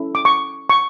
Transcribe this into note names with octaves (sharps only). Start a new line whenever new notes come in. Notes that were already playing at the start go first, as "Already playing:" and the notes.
Already playing: C#4 E4 A4
D6
C#6
C#6